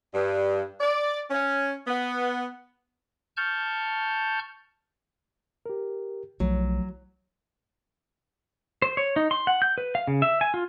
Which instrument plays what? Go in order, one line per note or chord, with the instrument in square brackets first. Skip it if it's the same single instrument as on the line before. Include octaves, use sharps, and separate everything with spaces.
[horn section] G2
D5
C#4
B3
[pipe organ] A5 C#6 F6 G6
[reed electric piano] G4 A#4
[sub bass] B1 [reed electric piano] F3 A3 [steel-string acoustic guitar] F#3
[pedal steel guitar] C5
C#5
D#4
C6
F#5
G6
B4
F5
C#3
E5
G#5
F4